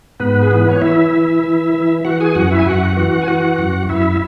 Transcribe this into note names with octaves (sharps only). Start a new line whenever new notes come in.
G#2 B3 B4
G#4
E3 B4
C#5
E3 E4 E5
E3
E3
E3
E3 F#4 F#5
G#4 G#5
F#2 F#4 F#5
E4 E5
G#5
F#2 F#4 F#5
E3 F#4 F#5
G#5
E3 F#4 F#5
F#2
F#2 E4 E5